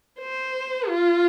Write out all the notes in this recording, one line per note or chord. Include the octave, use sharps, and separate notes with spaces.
C5
F4